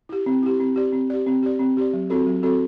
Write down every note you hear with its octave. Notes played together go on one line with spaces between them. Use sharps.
E4 G4
C4
E4 G4
C4
G4 D5
C4
G4 D5
C4
G4 D5
C4
G4 D5
F#3
C4 F#4 A4
F#3
C4 F#4 A4